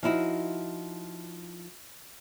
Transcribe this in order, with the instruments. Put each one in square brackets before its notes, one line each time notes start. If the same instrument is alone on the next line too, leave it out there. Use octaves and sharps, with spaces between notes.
[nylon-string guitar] F3 D#4 E4 F#4